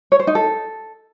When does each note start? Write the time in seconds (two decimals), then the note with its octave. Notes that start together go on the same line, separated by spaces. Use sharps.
0.12 C#5
0.20 C5
0.27 D#4
0.35 A4